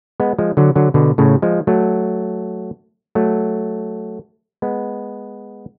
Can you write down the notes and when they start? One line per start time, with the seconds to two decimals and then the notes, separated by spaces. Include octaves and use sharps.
0.20 G#3 B3
0.38 F3 G#3
0.57 D3 F#3
0.76 D3 F#3
0.94 B2 D3
1.18 A2 C#3
1.42 F3 G#3
1.67 F#3 A3
3.15 F#3 A3
4.62 G#3 B3